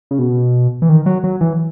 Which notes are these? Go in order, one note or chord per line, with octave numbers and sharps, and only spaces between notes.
C#3
B2
E3
D#3
F#3
F#3
E3